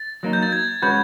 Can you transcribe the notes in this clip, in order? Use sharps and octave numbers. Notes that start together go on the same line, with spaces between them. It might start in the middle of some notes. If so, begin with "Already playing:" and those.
Already playing: A6
F#3 A#3 D#4
G6
A6
G#6
G#3 C#4 F#4 B4 G6